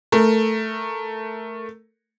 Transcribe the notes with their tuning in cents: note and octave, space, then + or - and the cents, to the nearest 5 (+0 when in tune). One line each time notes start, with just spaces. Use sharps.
A3 +0 A#4 -5